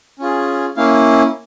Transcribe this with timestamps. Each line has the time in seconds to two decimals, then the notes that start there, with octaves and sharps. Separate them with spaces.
0.19 C#4 F4 G#4
0.77 A#3 C#4 E4 F5